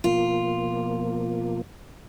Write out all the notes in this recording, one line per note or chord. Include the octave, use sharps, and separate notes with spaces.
B2 F3 A#3 F4